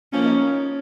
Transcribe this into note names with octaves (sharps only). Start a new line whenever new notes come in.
F3 A#3 C#4
D#4
C#4
C#4